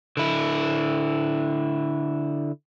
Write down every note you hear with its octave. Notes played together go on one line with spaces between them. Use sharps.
D3 E4